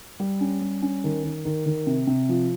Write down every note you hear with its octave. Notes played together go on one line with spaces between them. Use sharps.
G3
C#4
G3
C#4
D#3
D#3
D#3
D#3
C3
C3
F3